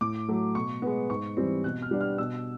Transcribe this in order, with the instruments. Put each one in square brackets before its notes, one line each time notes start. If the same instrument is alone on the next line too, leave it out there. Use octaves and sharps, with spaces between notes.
[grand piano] A2 D6
F#3 A3
B2 C#6
G#3 B3
G#2 C#6
E3 G3 C4
B2 F#6
F6
G3 B3 D4
F6
B2 E6